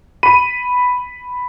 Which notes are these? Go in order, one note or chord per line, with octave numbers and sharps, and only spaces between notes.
B5 D#7